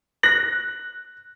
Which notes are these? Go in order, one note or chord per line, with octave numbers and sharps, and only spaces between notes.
F#6 A#6 F#7